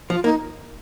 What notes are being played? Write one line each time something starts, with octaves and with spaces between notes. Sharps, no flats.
F3 F4
A#3 D#4